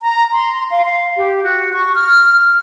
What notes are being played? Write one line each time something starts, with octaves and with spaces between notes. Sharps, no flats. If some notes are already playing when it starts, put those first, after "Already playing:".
A#5
C6
F5
F5
G4
F#4
C#6
F6